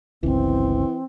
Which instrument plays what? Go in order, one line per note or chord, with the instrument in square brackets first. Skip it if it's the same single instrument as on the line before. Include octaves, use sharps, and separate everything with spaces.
[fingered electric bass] G1 C#2 [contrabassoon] E3 [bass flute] C4